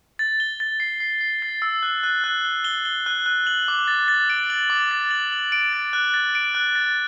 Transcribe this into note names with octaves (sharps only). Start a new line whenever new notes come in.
A6
G7
A6
C7
C7
C7
A6
E6
F#6
F#6
F#6
G7
G7
G7
F#6
F#6
F#7
D6
A6
A6
D7
F#7
D6
A6
F#7
F#7
D7
A6
F#6
A6
D7
F#6
A6